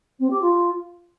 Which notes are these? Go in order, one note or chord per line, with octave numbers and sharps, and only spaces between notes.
C4
G4
F4